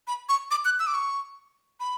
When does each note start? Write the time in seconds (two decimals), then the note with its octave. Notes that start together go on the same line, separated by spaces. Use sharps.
0.07 B5
0.29 C#6
0.51 D6
0.65 F#6
0.80 E6
0.87 D6
0.94 C#6
1.80 B5